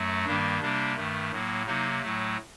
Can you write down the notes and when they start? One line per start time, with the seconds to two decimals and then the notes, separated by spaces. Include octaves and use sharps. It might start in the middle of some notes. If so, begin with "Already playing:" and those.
Already playing: F#2 F#3 A3
0.25 G2 D#3 G3 A#3 D4
0.61 C3 G3 A#3 D4
0.96 G2 D#3 A3
1.31 A2 F#3 A#3
1.66 C3 F#3 A#3 D#4
2.02 A2 F#3 A3